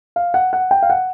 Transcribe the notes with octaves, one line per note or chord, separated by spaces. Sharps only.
F5
F#5
F#5
G5
F5
F#5